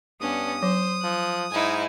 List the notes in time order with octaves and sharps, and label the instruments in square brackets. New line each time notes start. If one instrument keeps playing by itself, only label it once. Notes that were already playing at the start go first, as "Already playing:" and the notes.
[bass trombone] G2 [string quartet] B3 C#4 D4 [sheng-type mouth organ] D#6
[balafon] F#3 [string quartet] C5
[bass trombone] F3 [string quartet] F#6
[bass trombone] G#2 [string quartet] D#4 E4 G#5